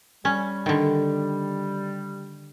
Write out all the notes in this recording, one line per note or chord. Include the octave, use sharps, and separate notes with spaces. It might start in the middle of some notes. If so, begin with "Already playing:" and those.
G3 C#4
D3 D#3